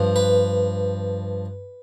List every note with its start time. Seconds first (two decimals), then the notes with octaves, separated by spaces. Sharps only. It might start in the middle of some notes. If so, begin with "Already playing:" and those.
Already playing: G2 F3
0.16 B4